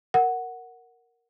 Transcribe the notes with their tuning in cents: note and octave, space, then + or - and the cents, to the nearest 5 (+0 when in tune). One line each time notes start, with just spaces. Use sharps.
A#4 -5 F#5 +0